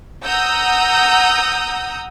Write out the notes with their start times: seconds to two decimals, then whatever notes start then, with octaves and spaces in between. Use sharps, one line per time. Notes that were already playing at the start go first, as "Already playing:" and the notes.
0.25 F#5 A#5 D#6 E6 G6